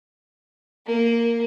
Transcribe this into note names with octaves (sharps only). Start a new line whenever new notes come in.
A#3